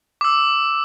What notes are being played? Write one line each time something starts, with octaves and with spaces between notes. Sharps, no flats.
D6 E6